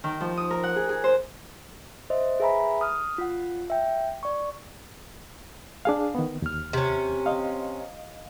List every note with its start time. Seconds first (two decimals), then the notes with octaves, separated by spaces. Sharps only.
0.04 D#3
0.21 F3
0.37 D#6
0.51 A#4
0.63 F#5
0.76 G#4
0.89 G#4
1.04 C5
2.10 C5 D#5 E5
2.40 G#4 B4 E5 G#5 A#5 B5
2.81 D#6 F6
3.18 F4 F#5
3.70 E5 G5
4.23 D5 C#6
5.85 D4 G#4 F5
6.15 D#3 B3
6.42 D#2 F6
6.73 C3 C#4
7.26 D#5 F5